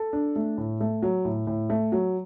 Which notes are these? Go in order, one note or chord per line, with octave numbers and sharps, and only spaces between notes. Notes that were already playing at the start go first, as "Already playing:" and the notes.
Already playing: A4
D4
A3
A2
A3
F#3
A2
A2
A3
F#3